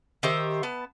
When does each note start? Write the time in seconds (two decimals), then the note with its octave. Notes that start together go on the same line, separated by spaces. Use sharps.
0.23 D#3 G4 C5 E5
0.63 B3 A5